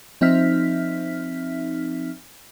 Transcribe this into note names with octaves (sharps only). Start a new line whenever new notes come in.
F3 C4 D#4 E5 F6 B6